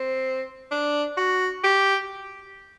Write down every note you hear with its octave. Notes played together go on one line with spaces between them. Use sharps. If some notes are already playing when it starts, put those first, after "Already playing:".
Already playing: C4
D4
F#4
G4